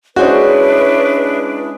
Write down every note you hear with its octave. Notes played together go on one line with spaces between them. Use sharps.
G#3 C#4 D4 E4 F#4 B4 C5 D5